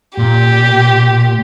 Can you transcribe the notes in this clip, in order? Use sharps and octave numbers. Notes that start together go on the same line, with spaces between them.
A#2 G4